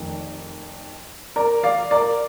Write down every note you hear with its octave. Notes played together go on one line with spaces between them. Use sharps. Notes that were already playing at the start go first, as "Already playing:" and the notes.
Already playing: F1 F2 D#3
A#4 D5
D5 F5
A#4 D5